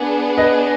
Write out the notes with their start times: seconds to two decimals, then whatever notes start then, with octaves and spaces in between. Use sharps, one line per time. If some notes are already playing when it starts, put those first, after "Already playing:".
Already playing: B3 D4 G#4
0.38 B4 D#5